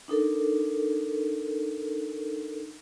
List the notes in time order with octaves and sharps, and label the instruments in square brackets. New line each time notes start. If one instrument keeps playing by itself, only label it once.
[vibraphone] D4 D#4 A4 A#4